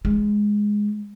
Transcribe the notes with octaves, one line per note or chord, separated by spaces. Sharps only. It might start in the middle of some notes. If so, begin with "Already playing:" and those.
G#3